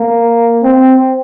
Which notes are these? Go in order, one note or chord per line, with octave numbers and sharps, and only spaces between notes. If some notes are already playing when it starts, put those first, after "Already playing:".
Already playing: A#3
C4